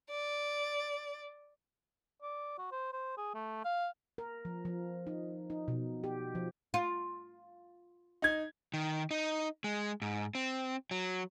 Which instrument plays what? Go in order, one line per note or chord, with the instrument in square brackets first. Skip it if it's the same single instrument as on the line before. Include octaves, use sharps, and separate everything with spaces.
[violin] D5
[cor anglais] D5
F#4
C5
C5
G#4
A3
F5
[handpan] A#4
F3
F3
D#4
D#4
B2
G4
F3
[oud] F4
[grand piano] D#4 G#6
[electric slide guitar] D#3
D#4
G#3
G#2
C4
F#3